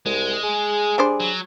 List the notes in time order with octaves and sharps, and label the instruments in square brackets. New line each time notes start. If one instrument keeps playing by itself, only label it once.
[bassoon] C2 [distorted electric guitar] G#3
[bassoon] G#4
[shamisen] G3 D4 C5
[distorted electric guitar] F#3